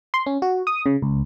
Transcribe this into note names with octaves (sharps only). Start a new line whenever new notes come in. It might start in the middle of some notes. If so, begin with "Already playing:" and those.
C6
C#4
F#4
D#6
C#3
C#2